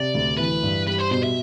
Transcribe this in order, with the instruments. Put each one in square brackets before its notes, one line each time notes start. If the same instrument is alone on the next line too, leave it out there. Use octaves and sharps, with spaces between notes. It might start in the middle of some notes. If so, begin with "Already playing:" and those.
Already playing: [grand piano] C3 [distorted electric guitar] D5
[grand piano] D2
[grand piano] E3 [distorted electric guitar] B4
[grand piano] G2
[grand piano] G3 [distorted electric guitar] B4
[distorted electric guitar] C5
[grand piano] B2 [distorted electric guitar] C5
[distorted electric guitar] E5